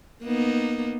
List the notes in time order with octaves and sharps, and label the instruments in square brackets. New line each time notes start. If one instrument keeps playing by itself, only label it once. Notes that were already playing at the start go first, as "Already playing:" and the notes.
[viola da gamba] A#3 B3 D#4